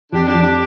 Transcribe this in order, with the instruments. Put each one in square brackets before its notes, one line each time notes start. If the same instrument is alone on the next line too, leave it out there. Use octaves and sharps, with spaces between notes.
[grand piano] F2 [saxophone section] D4 G4
[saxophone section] D4 G4
[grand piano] F2
[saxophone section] D4 G4